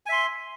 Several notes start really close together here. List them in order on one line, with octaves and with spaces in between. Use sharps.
G#5 E5 C6